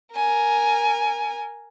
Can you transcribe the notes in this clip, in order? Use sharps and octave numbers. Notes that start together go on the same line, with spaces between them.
A#4 G#5